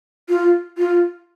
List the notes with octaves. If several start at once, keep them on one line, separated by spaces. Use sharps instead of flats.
F4
F4